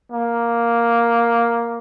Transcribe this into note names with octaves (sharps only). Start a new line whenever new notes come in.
A#3